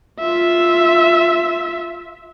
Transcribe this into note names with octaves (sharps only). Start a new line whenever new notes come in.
F4 E5